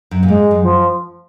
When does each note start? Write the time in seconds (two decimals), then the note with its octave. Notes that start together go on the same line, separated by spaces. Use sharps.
0.11 F#2
0.23 A#2
0.28 G#2 G#3
0.51 F#2
0.62 F3